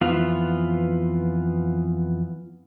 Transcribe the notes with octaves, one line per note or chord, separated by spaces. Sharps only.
F2 E3 B3 F4